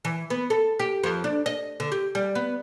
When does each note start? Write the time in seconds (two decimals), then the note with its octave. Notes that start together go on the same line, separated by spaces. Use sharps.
0.05 E3
0.30 B3
0.50 A4
0.79 G4
1.03 F2
1.24 D4
1.46 D#5
1.80 D3
1.92 G4
2.15 G3
2.35 B3